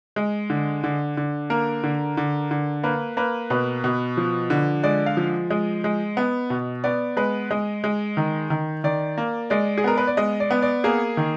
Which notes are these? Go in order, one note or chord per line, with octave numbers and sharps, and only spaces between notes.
G#3
D3
D3
D3
A#3 A#4
D3
D3
D3
A#3 B4
A#3 B4
B2 B4
B2
F3
D3
G#3 D5
F5
F3
G#3 D#5
G#3
B3
B2
B3 D5
G#3 B4
G#3 D#5
G#3
D#3
D#3
D#3 D5
A#3
G#3 D5
G#4
B3 A#4
B4
D5
G#3 D#5
D5
B3
D5
A#3 G#4
D#3